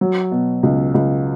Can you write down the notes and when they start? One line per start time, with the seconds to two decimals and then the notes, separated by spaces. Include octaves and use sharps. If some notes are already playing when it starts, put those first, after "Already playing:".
0.01 F#3
0.32 B2
0.63 C#2
0.94 C#2